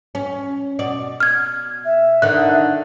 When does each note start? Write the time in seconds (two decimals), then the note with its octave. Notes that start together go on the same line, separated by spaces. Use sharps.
0.15 C#4
0.79 B2 D5
1.20 F6 G#6
1.85 E5
2.22 D3 D#3 F#6